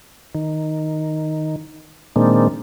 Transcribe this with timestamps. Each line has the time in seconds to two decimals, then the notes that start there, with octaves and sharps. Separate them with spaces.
0.35 D#3
2.16 A#2 D#3 G#3 A#3 C4 D4